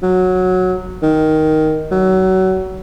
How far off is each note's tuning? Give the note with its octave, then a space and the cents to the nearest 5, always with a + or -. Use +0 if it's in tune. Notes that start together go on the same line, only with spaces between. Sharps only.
F#3 -10
D#3 +5
F#3 +25